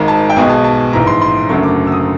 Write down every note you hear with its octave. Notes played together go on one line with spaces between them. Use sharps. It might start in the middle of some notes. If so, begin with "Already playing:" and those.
Already playing: G#1 G#2 D#3 G#3 A#5
A5
G5
B1 B2 G#3 G#5
A5
A5
A#1 G#2 E3 A#5
C6
C6
F#1 F#2 D3 F#3 A3 C#6
D6
E6
D#6